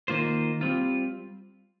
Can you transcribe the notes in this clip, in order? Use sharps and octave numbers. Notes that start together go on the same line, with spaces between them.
D#3 A#3 F4 C5
G3 C4 F4